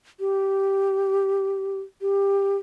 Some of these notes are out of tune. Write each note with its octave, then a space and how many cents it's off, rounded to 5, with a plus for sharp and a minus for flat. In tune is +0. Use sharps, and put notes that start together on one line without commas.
G4 -5
G4 +15